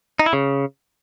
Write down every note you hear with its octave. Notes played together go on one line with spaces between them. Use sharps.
D#4
E4
C#3